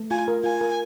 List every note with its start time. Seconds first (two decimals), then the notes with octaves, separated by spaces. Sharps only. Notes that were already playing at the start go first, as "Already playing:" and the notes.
Already playing: A3
0.11 F4 G#5
0.28 A#4
0.44 F4 G#5
0.61 A#4